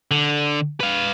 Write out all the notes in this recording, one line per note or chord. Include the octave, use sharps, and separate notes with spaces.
D3
B4 F5